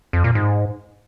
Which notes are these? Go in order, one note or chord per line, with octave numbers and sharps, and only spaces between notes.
F2
A#2
G#2